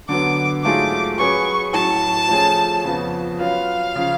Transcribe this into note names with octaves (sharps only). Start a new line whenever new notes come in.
D3 F#3 B3 D6
G#2 F#3 A3 F4 G#4 D6
F#3 C#4 G#4 B4 C#6
A2 F#3 C#4 A5
F3 A3 C#4 G#4
F2 C#3 F3 B3
F#3 C#4 F4 B4 F5
C#3 F3